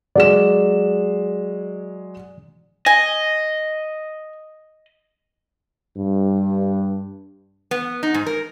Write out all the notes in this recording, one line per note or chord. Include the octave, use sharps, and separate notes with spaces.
F#3 G#3 D5 E7
D#5 G#5
G2
B3
D#4
G#2
A#4